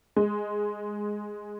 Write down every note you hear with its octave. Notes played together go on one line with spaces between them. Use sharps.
G#3